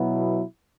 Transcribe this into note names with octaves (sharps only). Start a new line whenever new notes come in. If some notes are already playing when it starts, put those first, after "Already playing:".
Already playing: B2 F#3 B3 E4